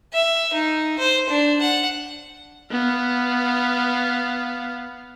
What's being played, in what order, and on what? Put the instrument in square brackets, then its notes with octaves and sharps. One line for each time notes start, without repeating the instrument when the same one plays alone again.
[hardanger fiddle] E5
D#4
C5
D4
F#5
[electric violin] B3 F5